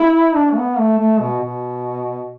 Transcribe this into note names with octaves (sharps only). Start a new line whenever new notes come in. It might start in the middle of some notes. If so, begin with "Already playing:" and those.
Already playing: E4
D4
A3
B3
A3
A3
B2
B2